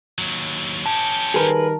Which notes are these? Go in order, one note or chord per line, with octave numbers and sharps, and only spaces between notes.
D#2 F#3
C#4 G4 A5
D#3 G3 G#4 A#4 B4